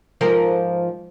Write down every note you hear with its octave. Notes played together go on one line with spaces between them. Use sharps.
G#2 F3 A#4